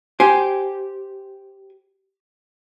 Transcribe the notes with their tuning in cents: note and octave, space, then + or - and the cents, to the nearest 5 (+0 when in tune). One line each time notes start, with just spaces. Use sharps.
G4 -10 C5 +0 G#5 +0